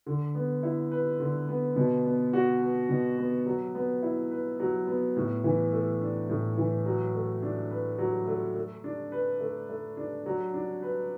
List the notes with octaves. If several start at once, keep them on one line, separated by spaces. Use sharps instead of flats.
D3
B3
E4
B4
D3
B3
B2
B3
F#4
B4
B2
B3
F#3
B3
E4
B4
F#3
B3
A2
E3
A3
D4
A2
E3
F#3
A3
D4
B4
F#3
A3
A3
D4
B4
A3
A3
D4
F#3
D4
B4